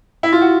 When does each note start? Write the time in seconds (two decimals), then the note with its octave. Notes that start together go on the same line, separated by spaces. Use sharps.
0.23 E4
0.33 F4
0.41 F#4